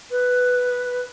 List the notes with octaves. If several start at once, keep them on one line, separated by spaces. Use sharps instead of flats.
B4